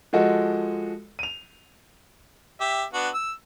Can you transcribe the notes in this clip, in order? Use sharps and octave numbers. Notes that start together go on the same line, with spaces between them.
F3 G#3 F#4 A4
D#7 F7
G4 E5
B3 D4 F#4
E6